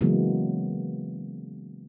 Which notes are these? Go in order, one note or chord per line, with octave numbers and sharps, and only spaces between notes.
C#3 E3 F#3 G#3 A#3 B3